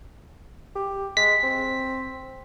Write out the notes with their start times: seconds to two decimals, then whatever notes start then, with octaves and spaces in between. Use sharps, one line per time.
0.76 G4
1.17 G#3 B6
1.43 C4